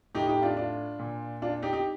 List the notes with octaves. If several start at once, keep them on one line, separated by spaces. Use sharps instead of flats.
A2 D#4 G4
D#4 G4
D4 F4
D4 F4
A#2
D4 F4
D#4 G4
D#4 G4